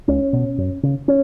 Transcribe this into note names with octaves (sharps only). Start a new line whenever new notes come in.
C#2 C#4
B2
F#2
C#3
C#4